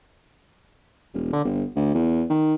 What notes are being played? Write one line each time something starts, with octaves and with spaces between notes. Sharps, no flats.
E1
D3
G1
D2
E2
D#3